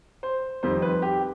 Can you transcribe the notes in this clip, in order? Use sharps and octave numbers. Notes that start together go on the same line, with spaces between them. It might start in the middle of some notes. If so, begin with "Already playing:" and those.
C5
F2 D#3 G3 C5
B4
G4